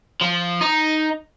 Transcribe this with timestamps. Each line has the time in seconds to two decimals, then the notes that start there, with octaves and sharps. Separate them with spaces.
0.21 F3
0.61 D#4